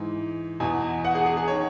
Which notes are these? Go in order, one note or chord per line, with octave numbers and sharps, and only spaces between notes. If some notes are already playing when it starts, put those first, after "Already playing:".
Already playing: G#2 E3
E2 B2 G#5
F#5
G#4
G#4
G#4
D#3 C#5